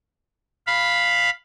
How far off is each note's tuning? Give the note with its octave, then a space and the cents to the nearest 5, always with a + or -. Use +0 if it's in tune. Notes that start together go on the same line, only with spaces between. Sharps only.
F5 +0 B5 +0